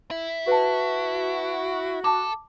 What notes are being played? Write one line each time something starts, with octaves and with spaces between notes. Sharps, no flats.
E4
F#4 B4 A5
A4 A5 D6